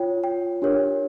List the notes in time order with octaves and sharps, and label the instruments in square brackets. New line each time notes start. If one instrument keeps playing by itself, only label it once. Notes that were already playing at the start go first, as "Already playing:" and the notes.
Already playing: [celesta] F4 C#5 G5
G5
D4 G4 A#4 C#5